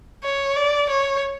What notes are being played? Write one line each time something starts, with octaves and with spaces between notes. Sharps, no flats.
C#5
D5
C#5